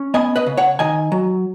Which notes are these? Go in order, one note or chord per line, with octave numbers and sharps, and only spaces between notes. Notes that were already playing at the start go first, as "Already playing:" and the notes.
Already playing: C#4
B3 D#5 G#5
B4 D#5
C#3
C#5 F#5
D#3 D#5 G#5
F#3